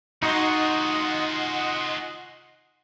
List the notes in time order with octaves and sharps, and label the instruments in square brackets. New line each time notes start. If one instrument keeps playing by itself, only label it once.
[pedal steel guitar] D#4 F#4 [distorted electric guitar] F4 G#4 [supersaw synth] D#5 F#5 C6